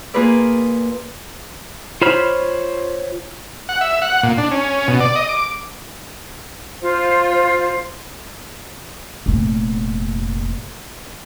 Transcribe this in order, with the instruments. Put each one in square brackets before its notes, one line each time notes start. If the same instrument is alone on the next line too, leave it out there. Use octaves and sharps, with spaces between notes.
[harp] A#3 F4 G#4 A#4 B4 D5
[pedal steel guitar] F4 C5 C#5 B5 F6
[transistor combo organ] F#5
E5
F#5
A#2
D4
C#4
B2
D5
D#5
D6
[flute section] F4 C5
[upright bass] F1 A#2